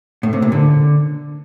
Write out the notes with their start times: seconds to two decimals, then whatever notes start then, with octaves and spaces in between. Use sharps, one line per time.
0.23 A2
0.33 C3
0.42 A#2
0.52 D3